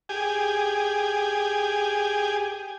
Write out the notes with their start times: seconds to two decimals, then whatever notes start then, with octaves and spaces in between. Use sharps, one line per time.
0.09 G4 G#4 G#5